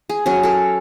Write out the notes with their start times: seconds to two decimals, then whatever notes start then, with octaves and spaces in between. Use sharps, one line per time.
0.09 G#4
0.26 F#3 C#4 G#4
0.43 A4 A#4